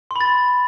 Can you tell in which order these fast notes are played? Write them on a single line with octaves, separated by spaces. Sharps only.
C6 B5 A6